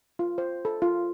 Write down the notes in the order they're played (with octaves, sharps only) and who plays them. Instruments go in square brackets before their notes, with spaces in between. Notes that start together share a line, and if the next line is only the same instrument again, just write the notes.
[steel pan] F4
C5
A4
F4